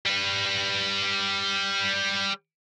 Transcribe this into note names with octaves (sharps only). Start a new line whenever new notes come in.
G3 B4